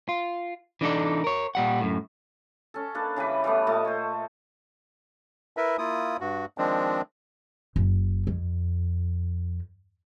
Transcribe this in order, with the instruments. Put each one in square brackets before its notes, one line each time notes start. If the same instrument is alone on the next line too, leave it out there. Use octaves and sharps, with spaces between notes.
[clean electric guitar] F4
E3 D4 D#4 A4 D5
A#4 C#5
A#2 G3 F#5
F#2 A2
[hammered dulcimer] C#4 A4
A#3 D4 A4 B4
C#3 E3 G3 B4
E3 G3 A3 B3
A#2 A3 D#5 A5
C5 C#5
[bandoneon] E4 A#4 B4 E5
A#3 E4 F4 D#6
G2 F#4
D#3 F3 G#3 C4 D4
[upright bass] F#1
F2